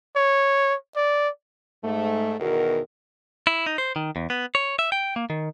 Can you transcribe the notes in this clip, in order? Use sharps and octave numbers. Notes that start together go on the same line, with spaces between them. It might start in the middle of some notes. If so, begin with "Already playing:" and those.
C#5
D5
G#2 A3
E2 B2 D#3 F#4 A#4
E4
D#4
C5
D#3
E2
B3
C#5
E5
G5
A#3
D#3